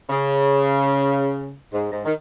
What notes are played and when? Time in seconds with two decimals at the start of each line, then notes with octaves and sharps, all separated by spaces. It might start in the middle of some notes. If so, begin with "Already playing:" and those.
0.10 C#3
1.73 G#2
1.92 G#2
2.05 D#3